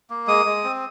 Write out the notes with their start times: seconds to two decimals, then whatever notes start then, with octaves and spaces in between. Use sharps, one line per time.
0.10 A#3
0.27 G#3 D#6
0.45 G#3
0.64 C4